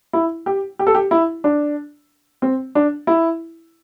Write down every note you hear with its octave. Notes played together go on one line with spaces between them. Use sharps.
E4
G4
G4
A4
G4
E4
D4
C4
D4
E4